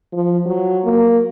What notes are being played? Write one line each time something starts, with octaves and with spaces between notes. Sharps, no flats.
F3
F#3
A#3